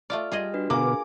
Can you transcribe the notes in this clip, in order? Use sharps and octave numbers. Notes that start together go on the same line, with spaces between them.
A3 F4 D5 F6
G3 F4 G#4 D#5
D4 F#4 B4
B2 D3 A#3 B3 G#4 G#5 D6